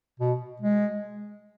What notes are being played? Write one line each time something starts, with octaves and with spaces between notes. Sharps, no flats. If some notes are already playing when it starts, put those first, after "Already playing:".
B2
G#3